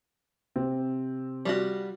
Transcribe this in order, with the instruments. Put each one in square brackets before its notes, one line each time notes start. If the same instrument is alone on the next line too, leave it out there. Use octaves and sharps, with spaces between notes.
[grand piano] C3 C4
[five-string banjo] G3 F4 F#4